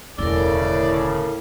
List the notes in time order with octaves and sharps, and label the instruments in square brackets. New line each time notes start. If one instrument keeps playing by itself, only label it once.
[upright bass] E1 D2 [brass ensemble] A2 C#3 [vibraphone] E4 A#4 [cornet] D5